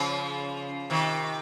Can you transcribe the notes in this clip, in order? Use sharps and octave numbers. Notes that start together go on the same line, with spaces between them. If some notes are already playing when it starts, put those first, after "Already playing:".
Already playing: C#3 F3
C3 D#3